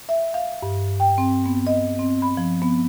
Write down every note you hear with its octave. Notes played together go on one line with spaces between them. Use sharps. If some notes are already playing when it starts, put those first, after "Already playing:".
E5
F5
G2
G5
C4
B3
D#5
C4
B5
F3
B3